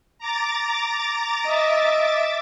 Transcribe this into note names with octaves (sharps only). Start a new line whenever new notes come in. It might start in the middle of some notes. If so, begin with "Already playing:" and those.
A#5 D6 A6
D#5 E5 D6 A6